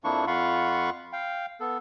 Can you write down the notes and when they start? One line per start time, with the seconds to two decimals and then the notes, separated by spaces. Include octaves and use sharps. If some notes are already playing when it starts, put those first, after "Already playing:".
0.04 F2 F3 A#3 D4 E4 C#6
0.27 F2 F4 F5 F#5 B5 C#6
1.13 F5 G5
1.60 B3 A4